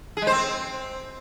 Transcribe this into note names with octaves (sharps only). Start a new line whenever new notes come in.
G#4
G#3
C5
C4